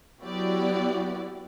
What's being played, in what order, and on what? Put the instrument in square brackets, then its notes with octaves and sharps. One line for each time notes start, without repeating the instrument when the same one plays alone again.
[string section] F#3 B3 E4 F#4 G4 D5